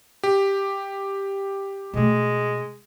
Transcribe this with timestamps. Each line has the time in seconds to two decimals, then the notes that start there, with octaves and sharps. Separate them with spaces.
0.23 G4
1.94 B2 G#3 A3